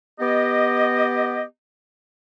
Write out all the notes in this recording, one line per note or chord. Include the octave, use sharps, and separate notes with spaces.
B3 G4 D#5